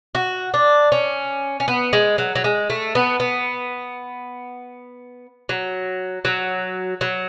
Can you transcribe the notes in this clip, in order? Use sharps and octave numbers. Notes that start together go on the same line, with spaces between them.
F#4
D4
C#4
C#4
B3
G#3
F#3
F#3
G#3
A3
B3
B3
F#3
F#3
F#3